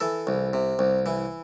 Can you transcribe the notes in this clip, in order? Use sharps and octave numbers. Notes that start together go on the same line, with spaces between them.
E3 A4
C2
C3
C2
E3